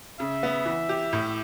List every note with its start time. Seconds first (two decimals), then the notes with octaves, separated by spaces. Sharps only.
0.20 C#3 E5
0.43 B3
0.66 E3
0.89 G4
1.13 A2